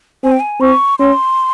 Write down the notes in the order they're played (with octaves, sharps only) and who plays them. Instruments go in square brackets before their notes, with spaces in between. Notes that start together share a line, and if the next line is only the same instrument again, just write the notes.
[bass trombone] C4 [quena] G#5
[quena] G5
G#5
[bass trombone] C4 [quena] C#6
[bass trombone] C#4 [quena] C6